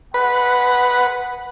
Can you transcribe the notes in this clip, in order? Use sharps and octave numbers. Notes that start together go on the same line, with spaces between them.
G#3 B4 F#5